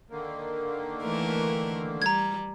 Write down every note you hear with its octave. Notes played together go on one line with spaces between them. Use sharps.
D3 D#3 A#3
E3 A3 A#4
G3 A#5 G#6